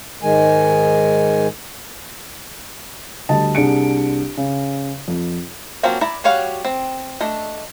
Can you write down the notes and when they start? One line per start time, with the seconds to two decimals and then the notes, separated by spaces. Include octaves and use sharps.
0.23 G#2 D#3 G#3 G#5
3.29 D2 G3 D#5 A5
3.55 C2 D4 G#4 C#7 D7
4.37 C#3
5.08 F2
5.83 F3 F#3 A#3 C4 C#4
6.01 E4 D5 A#5
6.24 G3 F#4 C#5 F5 F#5
6.65 C4
7.21 A3 D4 D#5